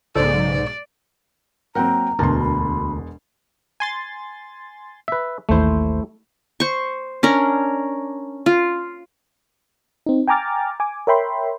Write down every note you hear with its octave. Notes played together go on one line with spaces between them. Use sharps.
B1 G#2 C#3 A4 C5 D5
F#3 A#3 C4 A#4 F#5 G5 A#5
E1 D2 B2 A#4 A5 C6
B5
G#5 C6 A6
B4 E5
A1 D#2 A3 E4 C5
C5 C#6
C#4 D4 A#4
F4
C4 D#4
G5 G#5 A#5 D6 F6 A6
G#5 D6
A#4 C#5 E5 G5 B5 C6